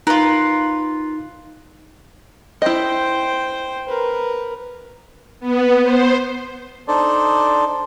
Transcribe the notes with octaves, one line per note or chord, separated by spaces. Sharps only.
D#4 F4 A#4 B4
E4 C5 D#5 G5
A#4 B4
B3
C5
D4 D#4 A4 C5 D5